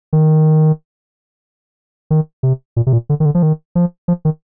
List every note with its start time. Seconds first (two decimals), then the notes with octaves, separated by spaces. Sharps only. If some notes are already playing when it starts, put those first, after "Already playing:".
0.13 D#3
2.10 D#3
2.43 C3
2.76 A#2
2.87 C3
2.93 A#2
3.09 D3
3.20 D#3
3.25 D3
3.35 F3
3.43 D#3
3.75 F3
4.08 F3
4.25 D#3